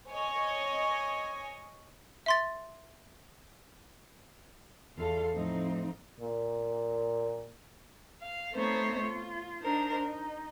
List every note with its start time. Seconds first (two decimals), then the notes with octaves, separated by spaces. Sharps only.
0.10 C#5 D#5 G#5
2.26 E5 C6 A6
4.96 E2 F4 A4 F5
5.33 A2 F3 C4 D#4
6.20 A#2
8.21 F5
8.52 A3 B3 C4 D#4 C5 C#5
9.00 F4
9.61 D4 D#4 A#4 C5
10.03 D#4